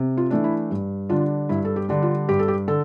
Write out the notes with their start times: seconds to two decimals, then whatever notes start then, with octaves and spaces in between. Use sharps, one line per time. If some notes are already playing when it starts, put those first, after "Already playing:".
Already playing: C3
0.17 F4
0.30 E3 A3 D4
0.44 E4
0.71 G2
1.09 D3 G3 D4 F4
1.49 G2 E4
1.65 A4
1.76 G4
1.89 D3 G3 D4
2.02 F4
2.28 G2 G4
2.39 A4
2.48 G4
2.68 D3 A4